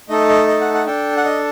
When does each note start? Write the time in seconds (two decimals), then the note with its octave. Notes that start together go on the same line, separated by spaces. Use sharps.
0.09 A3 D#4 A4 D#5
0.29 D#5
0.48 D#5
0.61 F#5
0.74 F#5
0.86 D4 A4 G5
1.17 F#5
1.25 D#5